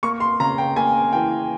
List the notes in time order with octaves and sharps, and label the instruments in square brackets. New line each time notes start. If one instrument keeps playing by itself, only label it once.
[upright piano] A#3 C#6
C6
C#3 A#5
G5
A#3 G#5
E3 G5